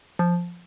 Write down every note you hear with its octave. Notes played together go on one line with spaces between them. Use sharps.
F3